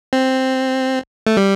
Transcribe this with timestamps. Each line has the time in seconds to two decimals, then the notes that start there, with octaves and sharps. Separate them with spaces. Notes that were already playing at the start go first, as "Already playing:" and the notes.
0.13 C4
1.27 A3
1.37 G3